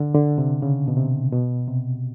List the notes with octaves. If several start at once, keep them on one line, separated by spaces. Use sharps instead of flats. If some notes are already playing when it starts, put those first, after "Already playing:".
Already playing: D3
D3
C3
C#3
B2
C3
B2
C3